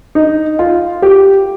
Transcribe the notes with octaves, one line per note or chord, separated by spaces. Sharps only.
D#4
F4
G4